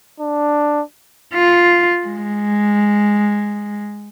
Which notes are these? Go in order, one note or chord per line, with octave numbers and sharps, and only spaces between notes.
D4
F4
G#3